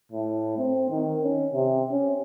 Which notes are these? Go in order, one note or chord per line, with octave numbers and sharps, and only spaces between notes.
A2
C4
D#3
C#4
C3
C#4